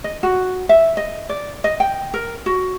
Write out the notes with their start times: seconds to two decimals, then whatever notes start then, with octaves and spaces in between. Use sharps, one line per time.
0.04 D#5
0.23 F#4
0.69 E5
0.97 D#5
1.29 D5
1.64 D#5
1.80 G5
2.14 A#4
2.46 F#4